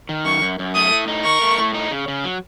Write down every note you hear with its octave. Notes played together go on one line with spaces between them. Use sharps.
D#3
F#2 C#6
F#2
F#2
A3 D#6
A2
D#4
A#4 C#6
A3
A2
D#4
C#3
C#3
F#3